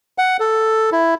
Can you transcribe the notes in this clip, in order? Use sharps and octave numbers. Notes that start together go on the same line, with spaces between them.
F#5
A4
E4